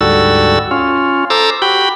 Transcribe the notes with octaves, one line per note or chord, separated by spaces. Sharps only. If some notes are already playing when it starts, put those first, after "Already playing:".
D2 G#2 G3 F#4 A4 E6
C#4 F4
A4 C5 A#5 D6 E6
F#4 G4 G5 B5